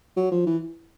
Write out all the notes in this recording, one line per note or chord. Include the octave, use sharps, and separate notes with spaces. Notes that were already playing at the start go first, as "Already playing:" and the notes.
F#3
F3
E3